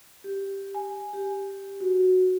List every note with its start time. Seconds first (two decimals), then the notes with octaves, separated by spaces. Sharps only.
0.24 G4
0.75 G#5
1.13 G4
1.81 F#4